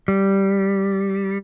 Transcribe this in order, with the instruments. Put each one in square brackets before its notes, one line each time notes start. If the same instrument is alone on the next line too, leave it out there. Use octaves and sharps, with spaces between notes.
[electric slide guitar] G3